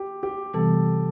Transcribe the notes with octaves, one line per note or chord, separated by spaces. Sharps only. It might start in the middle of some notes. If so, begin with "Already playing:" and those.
Already playing: G4
G4
C3 E3 G3 B3 A4